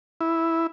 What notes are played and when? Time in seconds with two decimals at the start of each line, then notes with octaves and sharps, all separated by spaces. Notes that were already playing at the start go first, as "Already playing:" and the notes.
0.21 E4